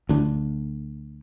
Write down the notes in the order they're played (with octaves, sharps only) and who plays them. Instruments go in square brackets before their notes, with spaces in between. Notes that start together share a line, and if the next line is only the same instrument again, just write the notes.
[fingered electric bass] D2 D3